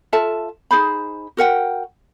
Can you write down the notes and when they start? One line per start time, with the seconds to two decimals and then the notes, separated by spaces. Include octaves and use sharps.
0.13 F4 A4 E5 A5
0.71 D#4 G#4 C5 B5
1.37 F#4 A#4 F#5 G5